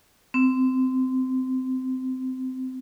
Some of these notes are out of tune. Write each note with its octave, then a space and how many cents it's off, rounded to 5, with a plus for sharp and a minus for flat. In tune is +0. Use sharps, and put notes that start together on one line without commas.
C4 -20